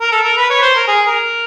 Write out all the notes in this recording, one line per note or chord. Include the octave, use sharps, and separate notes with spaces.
A#4
A4
A#4
B4
C#5
B4
C5
A#4
G#4
A#4